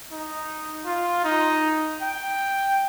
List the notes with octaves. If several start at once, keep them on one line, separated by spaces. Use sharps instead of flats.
D#4
F4
D#4
G5